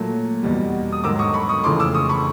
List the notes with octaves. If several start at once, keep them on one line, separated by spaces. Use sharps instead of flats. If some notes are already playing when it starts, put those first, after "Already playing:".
Already playing: A#2 F#3 A3
E2 B2 G3
D#6
G#2 D#3 F#3 D6 E6
C#6 D#6
B5 C#6
C#6 D#6
F2 C#3 E3 A3 C6 D6
D6 E6
C#6 D#6
B5 C#6